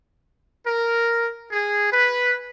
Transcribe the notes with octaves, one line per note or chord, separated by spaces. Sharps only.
A#4
G#4
B4